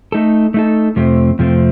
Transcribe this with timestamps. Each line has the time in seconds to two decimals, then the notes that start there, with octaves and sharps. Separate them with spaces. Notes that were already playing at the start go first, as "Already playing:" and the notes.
0.12 A3 D#4 A4
0.54 A3 D#4 A4
0.96 F2 C3 F3 A3 C4
1.39 F2 C3 F3 A3 C4